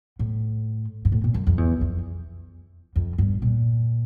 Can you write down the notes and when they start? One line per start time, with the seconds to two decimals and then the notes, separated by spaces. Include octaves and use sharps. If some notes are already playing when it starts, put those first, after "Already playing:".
0.19 A2
1.05 G#2
1.12 A2
1.24 A#2
1.34 F#2
1.47 F2
1.58 E2
1.81 F2
2.96 F2
3.18 G2
3.42 A#2